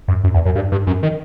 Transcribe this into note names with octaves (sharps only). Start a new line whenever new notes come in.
F#2
F#2
E2
F#2
G2
G2
F#2
D#3